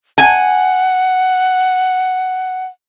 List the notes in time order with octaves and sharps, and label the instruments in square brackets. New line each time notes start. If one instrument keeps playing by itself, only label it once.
[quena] F#5 [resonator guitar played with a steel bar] G#5